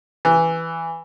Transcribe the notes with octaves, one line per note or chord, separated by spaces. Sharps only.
E3